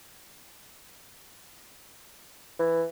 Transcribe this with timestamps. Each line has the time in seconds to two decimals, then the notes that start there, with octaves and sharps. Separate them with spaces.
2.59 E3